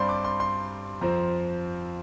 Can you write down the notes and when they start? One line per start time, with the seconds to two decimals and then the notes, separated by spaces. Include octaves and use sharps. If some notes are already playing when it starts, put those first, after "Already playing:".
Already playing: G2 G3 C4 D5 C6
0.09 D6
0.24 C6
0.40 C6
1.01 F2 F3 C4 A#5